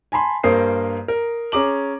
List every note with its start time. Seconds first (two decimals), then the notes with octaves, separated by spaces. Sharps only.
0.12 G#5 A5 B5 C6
0.44 G2 A#3 A#4 C5 D#6 C7
1.08 A#4
1.52 C#4 G#4 A#5 D6 F#7